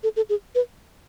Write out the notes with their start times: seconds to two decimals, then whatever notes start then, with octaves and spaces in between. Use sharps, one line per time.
0.03 A4
0.16 A4
0.30 G#4
0.55 B4